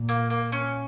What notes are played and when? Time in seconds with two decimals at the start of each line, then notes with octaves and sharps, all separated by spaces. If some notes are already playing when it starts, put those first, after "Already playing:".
Already playing: A#2
0.09 A#3
0.30 A#3
0.52 C#4